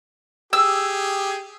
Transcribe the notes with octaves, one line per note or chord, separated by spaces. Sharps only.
G4 G#4 E6